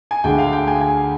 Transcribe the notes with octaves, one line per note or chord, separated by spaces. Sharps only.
G#5
D2 D3 G#3 G5
F5
G5
G#5
G#5